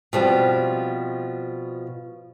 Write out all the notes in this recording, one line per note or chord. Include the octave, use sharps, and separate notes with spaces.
B2 F3 G3 C4